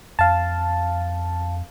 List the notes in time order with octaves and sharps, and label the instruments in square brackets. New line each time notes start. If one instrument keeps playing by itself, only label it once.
[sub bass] F2 [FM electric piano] F5 A5